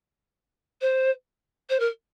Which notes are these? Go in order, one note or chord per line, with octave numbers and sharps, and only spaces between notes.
C5
C5
A#4